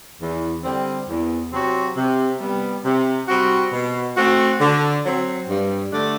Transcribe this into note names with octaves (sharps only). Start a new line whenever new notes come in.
E2
D3 G3 C4
E2
C3 F#3 C4 F#4
C3
G3 B3
C3
G3 C4 F#4
B2
A3 C4 F#4
D3
F#3 C4
G2
D3 A3 D4